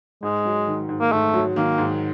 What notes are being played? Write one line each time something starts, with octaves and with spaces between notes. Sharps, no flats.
G#2 G#3
F#3
D#3
G#2
A#3
G#2 A3
F#3
D#3 A#3
G#2